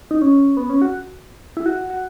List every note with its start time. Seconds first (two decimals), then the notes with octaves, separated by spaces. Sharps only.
0.11 D#4
0.22 C#4
0.57 B3
0.70 C#4
0.82 F#4
1.57 E4
1.66 F#4
1.90 F#4